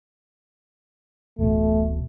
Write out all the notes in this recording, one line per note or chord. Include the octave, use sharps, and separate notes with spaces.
D1 A1 B2 A3